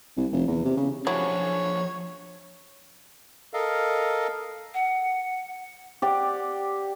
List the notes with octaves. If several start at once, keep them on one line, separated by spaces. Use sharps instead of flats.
C2
F1
E2
C3
C#3
F3 F#3 D4 E4 G#4 C#5
A4 A#4 D#5 F5
F#5
G4 D5 F#5